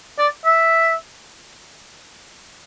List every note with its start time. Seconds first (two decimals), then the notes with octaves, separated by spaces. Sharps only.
0.18 D5
0.45 E5